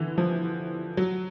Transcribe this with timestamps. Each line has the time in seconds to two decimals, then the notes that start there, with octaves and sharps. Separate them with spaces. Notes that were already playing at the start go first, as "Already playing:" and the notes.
Already playing: D3 E3
0.18 F3
0.97 F#3